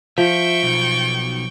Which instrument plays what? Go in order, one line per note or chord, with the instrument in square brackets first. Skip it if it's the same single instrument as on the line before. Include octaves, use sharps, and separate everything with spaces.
[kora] F3 [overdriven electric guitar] E5 [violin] G5 C#6
[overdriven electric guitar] B1